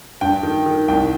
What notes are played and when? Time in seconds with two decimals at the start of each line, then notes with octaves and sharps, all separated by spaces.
0.21 G2 G5
0.43 D#3
0.66 D#3
0.88 C2 G5